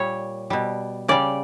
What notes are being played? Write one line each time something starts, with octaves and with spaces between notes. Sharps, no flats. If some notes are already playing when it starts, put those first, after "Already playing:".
Already playing: A#2 G3 C#5
B2 G3
C#3 G3 D5